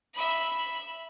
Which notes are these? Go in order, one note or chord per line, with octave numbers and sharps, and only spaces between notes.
E5 B5